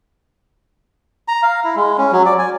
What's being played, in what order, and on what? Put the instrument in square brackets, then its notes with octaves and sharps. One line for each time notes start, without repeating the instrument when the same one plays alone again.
[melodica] A#5
F5
E4
G#3
C#4
F#3
D5
G#5